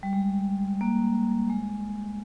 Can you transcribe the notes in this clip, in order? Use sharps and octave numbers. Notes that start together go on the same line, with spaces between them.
G3
G#3
A#3
G#3